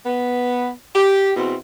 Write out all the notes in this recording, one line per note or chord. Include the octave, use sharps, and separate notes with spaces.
B3
G4
E2 B2 C4